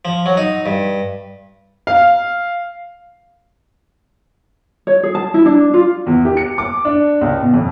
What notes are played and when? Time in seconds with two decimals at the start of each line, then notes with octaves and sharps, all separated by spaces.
0.05 F3
0.26 F#3
0.37 D#4
0.66 G2
1.87 F5
4.87 C#5
5.03 G#4
5.15 A5
5.34 E4
5.46 D4
5.74 F4
6.06 E2
6.25 G4
6.37 C#7
6.58 D6
6.85 D4
7.21 C#2
7.42 B2
7.54 F2